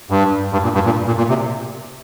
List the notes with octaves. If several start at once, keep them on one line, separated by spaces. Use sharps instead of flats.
G2
G2
A#2
G2
A#2
A#2
A#2
C3